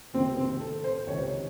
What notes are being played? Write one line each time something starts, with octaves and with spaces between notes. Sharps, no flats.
C#2 C3 D#3 C4
C4
A4
C5
C#2 C3 D#3 C#5